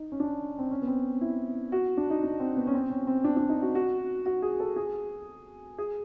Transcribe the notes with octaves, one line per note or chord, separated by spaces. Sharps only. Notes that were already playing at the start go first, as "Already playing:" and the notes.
Already playing: D#4
C#4
D4
C4
C#4
B3
C4
E4
F#4
D4
D#4
D4
C4
B3
C#4
C4
C#4
C4
D4
D4
D#4
F#4
F#4
F#4
G#4
A4
G#4
G#4